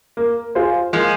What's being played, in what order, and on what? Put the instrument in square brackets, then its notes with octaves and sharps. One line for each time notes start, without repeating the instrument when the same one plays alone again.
[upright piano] A#3
F4 G#4 C5
[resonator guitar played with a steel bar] F3 G#3 [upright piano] A#3